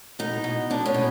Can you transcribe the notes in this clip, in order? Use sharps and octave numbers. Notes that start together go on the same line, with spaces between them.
B2 D#4
B2
B2 D4
C#4
B2